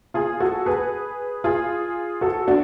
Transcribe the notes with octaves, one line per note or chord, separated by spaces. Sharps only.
F4 G#4
F#4 A4
G#4 B4
F4 G#4
F#4 A4
D4 F#4